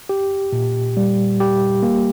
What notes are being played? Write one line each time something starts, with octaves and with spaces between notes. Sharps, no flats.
G4
A#2
G3
G4
A#3